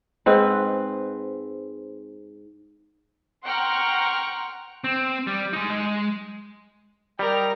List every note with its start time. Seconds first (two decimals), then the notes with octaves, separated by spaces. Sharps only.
0.26 G#2 C4 B4
3.44 F#5 G5 A#5 C6 C#6 F6
4.84 C4
5.27 G3
5.53 G#3 D#4
5.70 G#3 C6
7.19 G3 A#4 D#5 G5 A#5